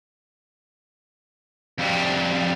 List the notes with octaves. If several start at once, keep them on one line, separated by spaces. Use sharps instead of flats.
F2 G3